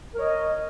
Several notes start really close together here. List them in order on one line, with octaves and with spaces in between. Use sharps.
A#4 C#5 D#5